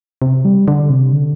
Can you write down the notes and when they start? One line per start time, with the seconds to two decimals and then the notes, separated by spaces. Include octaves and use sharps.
0.22 C3
0.45 G3
0.68 D3
0.90 C3
1.13 D3